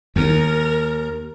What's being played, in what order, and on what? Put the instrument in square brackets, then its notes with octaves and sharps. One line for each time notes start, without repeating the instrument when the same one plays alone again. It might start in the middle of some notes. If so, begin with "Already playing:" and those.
[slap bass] D#2 [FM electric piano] D#3 [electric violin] A#4